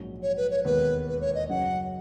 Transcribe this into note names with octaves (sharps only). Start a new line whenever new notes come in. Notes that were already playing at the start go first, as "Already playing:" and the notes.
Already playing: A#1 G#2 F#3 C#4
C#5
B4
C#5
E1 D#2 D#3 G#3 B3 B4
B4
C#5
D#5
F#2 C#3 F#3 C#4 F#5